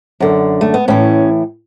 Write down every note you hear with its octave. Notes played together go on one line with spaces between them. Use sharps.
F#2 D3
A3
B3
A2 E3 C#4